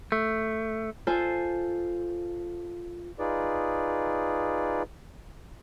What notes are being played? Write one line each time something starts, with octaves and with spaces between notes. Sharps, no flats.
A3
F4 A4 C5 G#5
D#4 F4 G#4 B4 D5